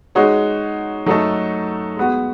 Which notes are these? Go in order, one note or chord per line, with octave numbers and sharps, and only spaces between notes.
G#3 D#4 F#4 C#5
F#3 A3 D#4 A4
G#3 B3 F#4